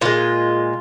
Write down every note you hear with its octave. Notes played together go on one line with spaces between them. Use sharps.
A#2 G#3 F4